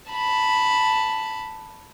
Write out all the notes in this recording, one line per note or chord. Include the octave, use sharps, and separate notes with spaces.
A5 B5